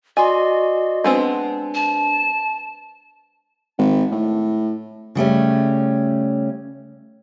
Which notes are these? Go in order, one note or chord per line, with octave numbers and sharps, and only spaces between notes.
F#4 D5 D#5 G#5 C6
G#3 B3 C4 D4
A5
G#1
A2
C#3 G3 A3 C#4